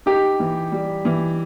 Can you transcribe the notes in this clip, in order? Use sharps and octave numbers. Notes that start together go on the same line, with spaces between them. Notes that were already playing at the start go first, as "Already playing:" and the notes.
D#4 G4
E3
G3
E3